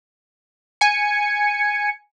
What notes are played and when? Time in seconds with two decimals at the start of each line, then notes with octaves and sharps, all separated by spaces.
0.81 G#5 C#7